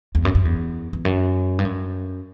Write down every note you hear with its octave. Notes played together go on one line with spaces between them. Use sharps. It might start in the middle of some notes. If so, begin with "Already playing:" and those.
E2
F#2
F#2
E2
E2
F#2
G2
F#2